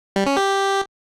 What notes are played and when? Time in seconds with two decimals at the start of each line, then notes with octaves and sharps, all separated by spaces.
0.16 G3
0.26 C#4
0.37 G4